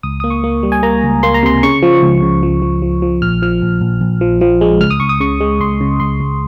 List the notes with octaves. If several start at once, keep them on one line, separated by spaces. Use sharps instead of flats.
C#2 D#6
A#3 D#6
C#6
A#3
G3
G#5
A#3 A#5
C#2
A#3 C6
A#5
C3 C6
C#3 C#6
F3
C#2
C#3
F3
F3
F3
F3
A#1 F6
F3 F6
A#1
A#1
A#1
F3
F3
G#3
C#2 F6
D#6
C#2 C#6
D#6
C#3 C#6
G#3
C#2 C6
C#3
C#2 C6
C#2